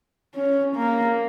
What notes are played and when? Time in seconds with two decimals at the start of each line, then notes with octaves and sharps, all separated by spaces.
0.35 C#4
0.76 A#3